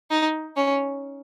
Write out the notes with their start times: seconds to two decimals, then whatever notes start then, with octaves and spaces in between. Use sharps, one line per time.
0.11 D#4
0.56 C#4